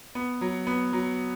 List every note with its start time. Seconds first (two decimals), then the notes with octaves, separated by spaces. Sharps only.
0.15 B3
0.41 F#3
0.67 B3
0.93 F#3